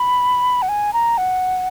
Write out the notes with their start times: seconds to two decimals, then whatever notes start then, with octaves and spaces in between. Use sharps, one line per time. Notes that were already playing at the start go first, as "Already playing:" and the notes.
Already playing: B5
0.62 F#5
0.69 G#5
0.93 A#5
1.18 F#5